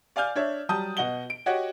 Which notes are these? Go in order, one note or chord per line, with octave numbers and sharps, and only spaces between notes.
D5 F5 G#5 F6 G6
D4 C#5 E5
F#3 G3 A5 D#6 G6
B2 D#5 F#5 F#7 G7
D7
F#4 G4 C#5 D#5 F#5